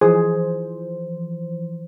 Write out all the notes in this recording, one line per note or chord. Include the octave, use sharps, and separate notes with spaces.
E3 F3 G#4 C5